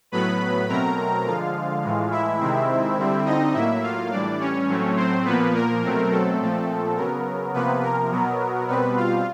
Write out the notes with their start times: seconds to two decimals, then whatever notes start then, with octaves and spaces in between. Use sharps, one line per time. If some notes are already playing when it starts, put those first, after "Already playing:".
0.12 A2 F#3 B3 B4 B5
0.69 B2 F#3 A3 C4 A#4 A#5
1.26 D3 F3 G#3 F4 F5
1.83 A2 E3 G#3
2.11 E4 E5
2.40 C3 D#3 G#3 C4
2.97 D3 G3 C4
3.26 D#4 D#5
3.54 A2 F#3 A#3 E4 E5
3.83 F4 F5
4.11 A2 E3 G3 D4 D5
4.40 C#4 C#5
4.68 A2 F#3 A3 C4
4.96 C4 C5
5.25 A#2 F3 A#3 B3 B4
5.54 A#4
5.82 B2 F#3 A3 C4
6.11 A4
6.39 A#2 F3 A3 C4
6.96 C#3 F#3 B3 A#4
7.54 C3 F3 A#3 B3 B4
7.82 A#4
8.11 B2 F#3 B3
8.68 B2 G3 B3 C4 B4
8.96 F4 F5